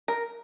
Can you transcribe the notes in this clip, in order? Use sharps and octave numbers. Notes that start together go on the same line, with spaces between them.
A#4